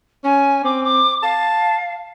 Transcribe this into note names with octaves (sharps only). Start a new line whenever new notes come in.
C#4 G#5
C4 D6
D6
F5 A5